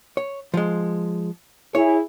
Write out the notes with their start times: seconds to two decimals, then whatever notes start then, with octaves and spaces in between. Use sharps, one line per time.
0.17 C#5
0.54 F3 G#3
1.75 E4 G#4 C#5